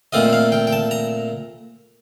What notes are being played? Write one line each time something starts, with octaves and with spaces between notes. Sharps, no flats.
A#2 A3 C4 F4 D#5
F5
G5
G5
A5
A#5